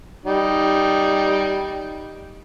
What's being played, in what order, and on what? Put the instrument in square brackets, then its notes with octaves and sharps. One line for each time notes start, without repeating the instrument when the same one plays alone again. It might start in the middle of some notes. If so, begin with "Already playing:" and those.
[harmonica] G3 D#4